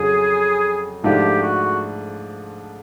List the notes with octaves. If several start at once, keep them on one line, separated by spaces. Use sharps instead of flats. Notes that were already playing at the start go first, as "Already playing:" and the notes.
Already playing: F2 C#3 F#3 G#4
G#2 F3 A3 D4 F4 G4
F#4